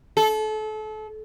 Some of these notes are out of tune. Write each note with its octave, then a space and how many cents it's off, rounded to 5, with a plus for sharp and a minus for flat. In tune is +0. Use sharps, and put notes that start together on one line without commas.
A4 -30